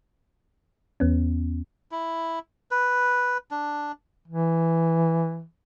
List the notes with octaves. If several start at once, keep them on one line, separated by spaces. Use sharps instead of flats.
E2 B3 C#4
E4
B4
D4
E3